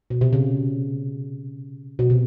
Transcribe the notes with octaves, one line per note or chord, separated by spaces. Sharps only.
B2
C3
C#3
B2
C3